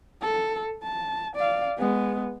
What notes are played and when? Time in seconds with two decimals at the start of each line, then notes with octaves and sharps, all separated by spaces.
0.22 A4
0.83 A5
1.36 D5 F5
1.78 G#3 B3